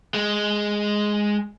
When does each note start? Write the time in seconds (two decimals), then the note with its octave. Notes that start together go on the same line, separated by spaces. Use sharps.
0.14 G#3